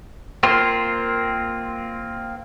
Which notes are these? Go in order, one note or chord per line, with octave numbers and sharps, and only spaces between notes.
A#3 C4 F4